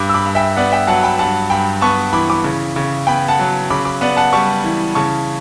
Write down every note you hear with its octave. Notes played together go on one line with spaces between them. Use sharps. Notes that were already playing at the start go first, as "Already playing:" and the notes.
Already playing: G2 B5 D6
E6
B5 D6
G2
E5 G5
B3 D5 F#5
E5 G5
F#3 F#5 A5
G5 B5
G2 F#5 A5
G2 G5 B5
B3 A5 C#6
E3 B5 D6
B5 D6
C#3
C#3
B3 G5 B5
F#5 A5
F#3
C#3 B5 D6
B5 D6
B3 D5 F#5
F#5 A5
G3 A5 C#6
E3
C#3 A5 C#6